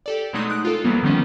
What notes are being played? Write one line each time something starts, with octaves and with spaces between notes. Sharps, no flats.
G4 A4 D5
B2 F#3 G#3 A3 D#4 D#6
D#6 F#6 D7
F4 A4
F#2 E3 F#3 G3 A#3 B3
D3 D#3 F3 G3 B3 C#4